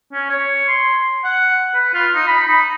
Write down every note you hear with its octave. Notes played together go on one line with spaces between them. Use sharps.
C#4
C#5
C6
F#5
B4
F4
D#4
B5
D#4